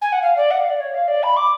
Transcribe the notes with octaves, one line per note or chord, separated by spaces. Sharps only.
G#5
F#5
F5
D5
F#5
F5
D5
C#5
F5
D5
B5
D6